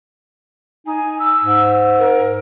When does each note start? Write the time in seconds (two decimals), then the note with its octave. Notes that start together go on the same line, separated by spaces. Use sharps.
0.87 D#4 G#5
1.19 E6
1.44 G#2
1.99 A#4